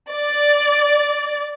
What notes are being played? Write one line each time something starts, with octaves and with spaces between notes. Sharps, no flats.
D5